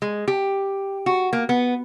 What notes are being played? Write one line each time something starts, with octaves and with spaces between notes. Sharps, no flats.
G#3
G4
F#4
A#3
B3